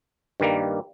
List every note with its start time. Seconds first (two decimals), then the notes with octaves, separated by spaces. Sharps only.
0.40 G2 D#3 G3 A#3